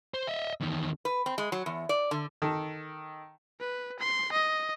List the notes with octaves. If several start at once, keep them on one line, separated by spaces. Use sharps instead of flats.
C5
D#5 E5
E2 D#3
B4
C4
G#3
F#3
E2
D5
D3
D#3 A4
B4
C6
D#5